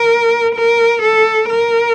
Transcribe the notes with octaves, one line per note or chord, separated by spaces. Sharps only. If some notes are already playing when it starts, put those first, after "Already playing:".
Already playing: A#4
A#4
A4
A#4